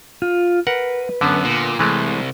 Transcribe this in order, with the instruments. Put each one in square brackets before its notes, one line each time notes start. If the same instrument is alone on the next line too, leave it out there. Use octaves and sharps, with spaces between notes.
[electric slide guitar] F4
[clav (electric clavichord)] A#4 F#5 [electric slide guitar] B4
[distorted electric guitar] F#2 [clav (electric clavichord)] D3 B3
[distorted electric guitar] A#2
[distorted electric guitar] C2 [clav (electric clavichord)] E3 G#3 A3